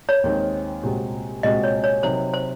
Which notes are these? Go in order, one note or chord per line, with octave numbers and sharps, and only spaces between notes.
C#5
D#2 D#3 G#3 C4
C2 A#2 G#3 C4 F#4
C2 A#2 G#3 C4 F#4 D#5
C#5
C#5
C3 F#3 A#3 D#4 C5
C5